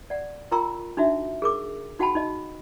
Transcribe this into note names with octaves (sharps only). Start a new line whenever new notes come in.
D5 F#5
F4 A#4 G5 A#5 C6 E6
D4 D#4 F#4 E5
G#4 A#4 D6
D#4 F#4 F#5 G5 A5 B5
D#4 D#5